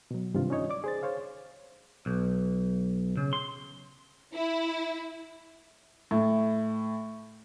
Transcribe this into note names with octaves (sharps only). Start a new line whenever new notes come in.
B2 F#3
G2 C3 D#3 F4
C#4 D#4 C#5 D#5
D5 D6
G#4 C5 A6
C5 C#5 F5
B1
C#3
C6
E4
A2